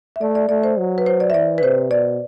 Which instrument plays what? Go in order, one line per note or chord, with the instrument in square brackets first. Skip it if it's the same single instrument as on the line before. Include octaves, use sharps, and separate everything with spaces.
[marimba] E5
[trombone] A3 [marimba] D5
[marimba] D5
[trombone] A3 [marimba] D5
[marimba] C5
[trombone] F#3
[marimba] B4
C5
D5
E5
[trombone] E3 [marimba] D5
[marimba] B4
[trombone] C3 [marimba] C5
[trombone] B2 [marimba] D5